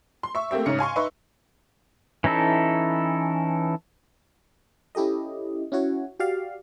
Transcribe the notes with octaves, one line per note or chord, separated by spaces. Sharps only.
C6
E5 C#6
A3 A#3 C4 G4 E5
G#2 C#3 C#4 C#7
F5 G#5 C6 C#6
D#4 B4 E5 C6 C#6
E3 C#4 D#4 E4 A4
C#4 E4 G4 A4 D#5
C#4 E4 F#4 C#5
F#4 G4 D5 F5